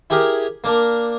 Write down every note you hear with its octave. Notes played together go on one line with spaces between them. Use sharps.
E4 G4 G#4 A#4
A#3 D4 A#4